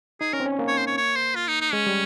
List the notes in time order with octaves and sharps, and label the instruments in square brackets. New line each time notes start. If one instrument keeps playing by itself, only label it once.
[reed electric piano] D#4 [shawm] G#4
[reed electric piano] C#4 [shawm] A#4
[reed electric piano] C4
C#4
A#3
[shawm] C#5
C5
C#5
C#5
C5
F4
D#4
D#4
[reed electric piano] G#3 [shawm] C#4
[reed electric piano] G3